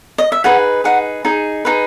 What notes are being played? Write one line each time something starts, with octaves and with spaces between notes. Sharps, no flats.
D#5
E5
D#4 G#4 B4 F#5
D#4 G#4 B4 F#5
D#4 G#4
D#4 G#4 B4